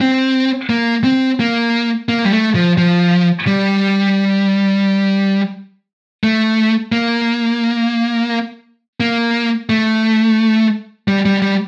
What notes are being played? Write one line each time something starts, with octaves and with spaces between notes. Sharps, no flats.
C4
A#3
C4
A#3
A#3
G3
A3
F3
F3
G3
A3
A#3
A#3
A3
G3
G3
G3